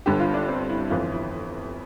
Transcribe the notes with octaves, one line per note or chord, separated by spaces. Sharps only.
G1 G2 D3 G4
F4
D4
C4
E4
G1 F2 E3 F4
E4